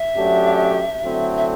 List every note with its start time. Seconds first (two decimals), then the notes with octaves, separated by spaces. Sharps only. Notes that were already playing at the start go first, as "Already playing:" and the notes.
Already playing: E5
0.15 F#2 F#3 A3 D4 G4
1.01 D3 F#3 A3 C4 E4
1.37 E5